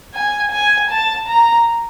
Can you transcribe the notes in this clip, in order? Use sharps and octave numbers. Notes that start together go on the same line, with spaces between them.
G#5
G#5
A5
A#5